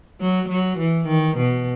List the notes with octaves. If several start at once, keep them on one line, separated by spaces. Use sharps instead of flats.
F#3
F#3
E3
D#3
B2